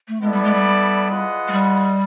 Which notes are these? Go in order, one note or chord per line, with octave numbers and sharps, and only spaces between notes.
A3
G#3 B3 E4 A4 D5
G3
G#3
G3
F4 G#4 B4 D#5 F#5
G#3
G3